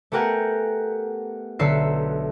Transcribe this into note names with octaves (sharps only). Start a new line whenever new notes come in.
A3 B3 G4 A#4 F#5 G#5
B1 D3 B4 E5 C7 C#7